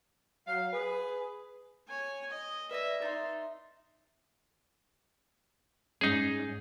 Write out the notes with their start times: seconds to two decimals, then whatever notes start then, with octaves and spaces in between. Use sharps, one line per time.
0.47 F#3 F5
0.73 G#4 B4
1.88 C#5 G#5
2.31 D#5
2.71 B4 D5 E5 A#6
3.02 D#4 E5 C6 A6
6.01 G#2 C#4 D#4 G#4